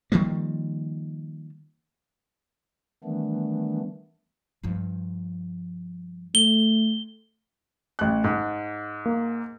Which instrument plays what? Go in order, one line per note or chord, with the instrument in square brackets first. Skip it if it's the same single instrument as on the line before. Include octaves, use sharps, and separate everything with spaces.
[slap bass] D#3 F3 G3 A#3
[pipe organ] D#3 E3 G3 A3 B3 D4
[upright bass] G2 F3
[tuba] A3 [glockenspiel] G7
[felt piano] A1 F#6
G#2
[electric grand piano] A#3